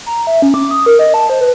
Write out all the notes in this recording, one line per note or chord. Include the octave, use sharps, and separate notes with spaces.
A#5
E5
C#4
D6
D#6
A#4
D#5
A5
C5
B4